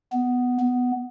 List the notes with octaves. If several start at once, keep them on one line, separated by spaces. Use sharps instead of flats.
B3
B3